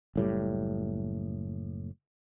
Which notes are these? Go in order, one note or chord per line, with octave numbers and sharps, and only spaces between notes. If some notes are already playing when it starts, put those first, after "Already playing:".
F#1 A2 G3